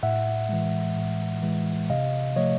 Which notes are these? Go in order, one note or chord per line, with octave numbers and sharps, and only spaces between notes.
A2 E5 F#5
E3 G#3
A2
E3 G#3
C3 D#5 F5
F3 A3 C#5 D#5